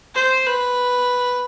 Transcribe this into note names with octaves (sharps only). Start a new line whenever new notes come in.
C5
B4